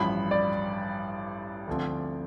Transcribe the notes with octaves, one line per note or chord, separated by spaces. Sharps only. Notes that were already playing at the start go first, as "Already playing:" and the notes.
Already playing: A1 G2 F3 B5
D5
D2 D3 F3 C4